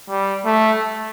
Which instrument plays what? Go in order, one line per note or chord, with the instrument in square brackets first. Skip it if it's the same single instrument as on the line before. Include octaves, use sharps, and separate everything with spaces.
[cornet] G3
A3